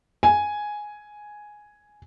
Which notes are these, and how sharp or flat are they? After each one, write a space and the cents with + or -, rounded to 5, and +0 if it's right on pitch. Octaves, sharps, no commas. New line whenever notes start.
G#5 +5